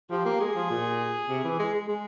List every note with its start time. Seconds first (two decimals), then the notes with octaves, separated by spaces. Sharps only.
0.10 F3 G4
0.26 A#3
0.40 G#3 G#4
0.55 F3
0.70 A#2
1.29 C3
1.44 E3
1.59 G#3
1.74 G#3
1.88 G#3